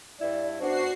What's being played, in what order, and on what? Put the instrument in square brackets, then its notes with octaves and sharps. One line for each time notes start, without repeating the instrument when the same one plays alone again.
[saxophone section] G2 E4 [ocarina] D5
[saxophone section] F#2 B3 D4 [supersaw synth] F#4 C7 [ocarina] C5